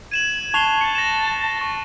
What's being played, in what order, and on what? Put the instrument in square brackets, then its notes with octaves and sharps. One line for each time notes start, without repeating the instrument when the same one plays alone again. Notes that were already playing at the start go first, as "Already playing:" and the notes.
[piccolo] G#6 [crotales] D#7 E7 F#7
[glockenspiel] A5 C#6 F7 [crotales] F#6 C7 G7
[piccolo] A5 [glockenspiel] C#7
[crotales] A#6 E7
C#6